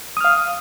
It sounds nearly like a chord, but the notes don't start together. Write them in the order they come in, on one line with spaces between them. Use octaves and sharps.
D#6 F6 F5